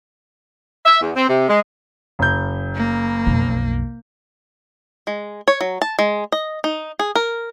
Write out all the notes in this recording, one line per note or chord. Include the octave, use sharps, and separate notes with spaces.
E5
E2
C4
C3
G#3
F#1 G6
A#3
B1 F2
G#3
C#5
F#3
A5
G#3
D#5
D#4
G#4
A#4